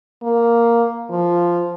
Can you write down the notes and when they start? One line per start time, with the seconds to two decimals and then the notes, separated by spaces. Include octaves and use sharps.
0.23 A#3
1.10 F3